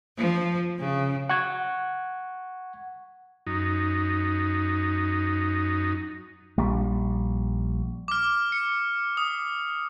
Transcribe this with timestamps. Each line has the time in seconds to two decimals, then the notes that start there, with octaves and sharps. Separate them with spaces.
0.17 F3
0.78 C#3
1.29 F#5 C#6 G#6
3.47 F#2 D#4
6.58 A#1 G3
8.08 D6 F6
8.52 C#7
9.17 D#6